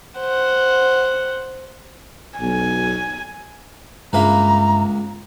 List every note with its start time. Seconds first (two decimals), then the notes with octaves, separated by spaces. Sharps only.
0.20 C5 F#5
2.39 B1 G#5
4.13 C#2 G2 A#3 E5 A#5 B5